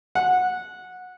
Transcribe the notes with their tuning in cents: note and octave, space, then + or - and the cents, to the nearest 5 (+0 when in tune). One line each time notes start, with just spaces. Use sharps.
F#5 -15